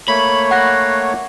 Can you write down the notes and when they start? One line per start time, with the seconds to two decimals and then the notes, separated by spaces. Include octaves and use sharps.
0.08 A3 A#3 C#5 B5
0.51 F#5 F#6 A#6